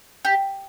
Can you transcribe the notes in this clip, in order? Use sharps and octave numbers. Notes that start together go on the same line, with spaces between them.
G4